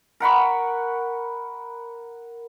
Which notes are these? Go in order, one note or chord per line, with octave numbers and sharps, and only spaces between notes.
A#4 F#5 B5 C#6